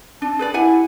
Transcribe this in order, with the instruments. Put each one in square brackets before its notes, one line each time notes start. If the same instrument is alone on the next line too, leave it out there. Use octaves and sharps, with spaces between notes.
[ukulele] D4 [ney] A5
[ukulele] G#4 B4 D5
[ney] E4 [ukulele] G4 F#5 G#5